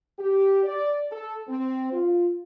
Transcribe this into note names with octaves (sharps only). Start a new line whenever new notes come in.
G4
D5
A4
C4
F4